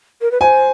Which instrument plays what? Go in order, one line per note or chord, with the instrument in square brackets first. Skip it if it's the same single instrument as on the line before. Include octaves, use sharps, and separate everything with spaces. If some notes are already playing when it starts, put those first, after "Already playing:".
[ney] A#4
B4
[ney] C5 [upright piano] G#5